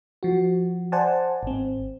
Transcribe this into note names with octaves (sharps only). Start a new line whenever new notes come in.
F3 F#4
C5 D5 F#5 G#5 A5
G#1 C4